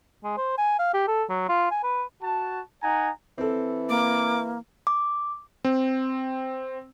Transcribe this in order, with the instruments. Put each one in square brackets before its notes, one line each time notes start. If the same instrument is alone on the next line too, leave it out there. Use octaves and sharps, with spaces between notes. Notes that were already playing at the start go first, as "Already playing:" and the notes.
[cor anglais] G#3
C5
G#5
F5
G4
A4
F#3
F4
G#5
B4
[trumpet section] F#4 A5
D#4 F#5 G#5 A#5
[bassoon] E3 [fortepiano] C4 A4
[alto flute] A#3 [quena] D6
[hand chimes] D6
[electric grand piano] C4